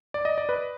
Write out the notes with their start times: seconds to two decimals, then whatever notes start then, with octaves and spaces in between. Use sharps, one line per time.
0.14 D5
0.25 D#5
0.38 D5
0.49 B4